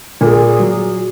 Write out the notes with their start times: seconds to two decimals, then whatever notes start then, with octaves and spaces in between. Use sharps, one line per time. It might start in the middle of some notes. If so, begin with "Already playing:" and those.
0.21 A#2 A#4
0.27 G#4
0.47 G#4
0.59 F#3